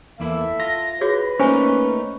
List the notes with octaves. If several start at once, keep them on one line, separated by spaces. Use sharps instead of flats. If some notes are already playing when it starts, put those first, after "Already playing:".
E2 A#3 E4 A4 E5
F4 A#6
F#4 G#4 B4 C#5
A3 A#3 C#4 D#4 C5 G#5